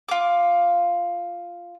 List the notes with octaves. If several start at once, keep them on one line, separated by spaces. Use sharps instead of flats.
F4 D6